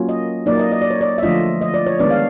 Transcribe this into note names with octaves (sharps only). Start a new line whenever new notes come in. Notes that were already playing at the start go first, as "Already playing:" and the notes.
Already playing: F#3 A#3 C#4 F4
D#5
F#3 A#3 D#4 D5
D#5
D#5
D5
C#5
D5
E5
D3 F3 A3 D4 F4 D#5
D#5
D5
C#5
D#3 G#3 B3 D4 D5
F5